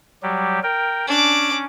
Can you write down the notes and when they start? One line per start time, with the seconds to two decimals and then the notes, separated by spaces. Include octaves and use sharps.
0.23 F#3 G3 G4
0.63 A#4 G5
1.07 C#4 D4 D6